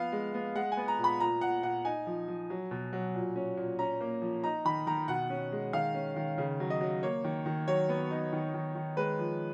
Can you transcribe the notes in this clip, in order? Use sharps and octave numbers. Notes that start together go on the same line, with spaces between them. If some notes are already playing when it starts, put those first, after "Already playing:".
Already playing: F3 B3 F5
G#3
B3
G#3 F#5
G#5
B3
A#5
A#2
B5
A#2 A#5
A#2 F#5
A#2 F#5
D#4 G#5
F3
F3
F#3
B2
F#3
A#2
C#4
A#2
C#4 A#5
A#3
F3
D#4 A#5
D#3 B5
D#3 A#5
B2 F#5
C#4
G#3
D#3 F5
C#4
D#3
C#3
F#3
D#5
F#3
A#3 C#5
D#3
D#3
F#3 C#5
B3
D#4
D#3
D#3
D#3
G#3 B4
F3